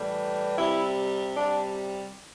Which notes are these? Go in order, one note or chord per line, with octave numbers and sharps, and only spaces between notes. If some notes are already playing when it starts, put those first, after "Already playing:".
Already playing: A2 E3 G3
C3 G3 E4
C3 G3 D4